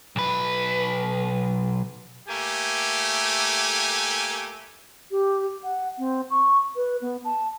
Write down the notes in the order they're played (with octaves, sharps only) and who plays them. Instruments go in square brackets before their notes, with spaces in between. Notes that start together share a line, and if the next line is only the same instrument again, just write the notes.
[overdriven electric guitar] B1 B4
[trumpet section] A3 A#3 G4 G#5
[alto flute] G4
F#5
C4
C#6
B4
B3
A5